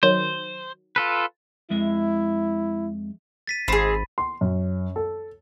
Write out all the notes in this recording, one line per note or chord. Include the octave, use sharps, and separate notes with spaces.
D#3 F#3 C5
F4 A4 B4
F2 G#3 E4 E5
A6 B6 D#7
G#1 C4 G#4 B5
C6
F#2
A4